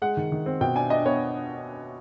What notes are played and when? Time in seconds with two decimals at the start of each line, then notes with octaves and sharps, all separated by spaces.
0.02 G#3 F#5
0.17 D#3
0.32 D#3
0.46 C4
0.61 B2 G5
0.75 D4 G#5
0.90 D4 D#5
1.05 B3 C#5